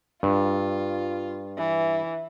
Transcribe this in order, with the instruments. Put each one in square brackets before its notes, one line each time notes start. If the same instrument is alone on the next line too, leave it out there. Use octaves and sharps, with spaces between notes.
[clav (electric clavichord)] G2 [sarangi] F4
[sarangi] E3